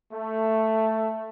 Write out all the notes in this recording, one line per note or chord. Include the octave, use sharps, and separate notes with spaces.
A3